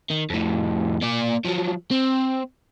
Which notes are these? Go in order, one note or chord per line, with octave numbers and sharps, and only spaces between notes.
D#3
F2 A2
A#3 D5
F3 F#3
C4